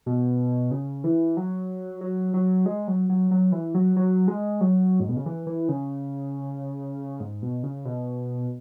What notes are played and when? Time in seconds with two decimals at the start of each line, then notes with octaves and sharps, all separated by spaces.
0.06 B2
0.71 C#3
1.04 E3
1.37 F#3
2.01 F#3
2.34 F#3
2.66 G#3
2.88 F#3
3.09 F#3
3.31 F#3
3.52 E3
3.74 F#3
3.96 F#3
4.28 G#3
4.61 F#3
5.00 G#2
5.09 B2
5.16 C#3
5.26 E3
5.47 E3
5.69 C#3
7.20 G#2
7.42 B2
7.63 C#3
7.85 B2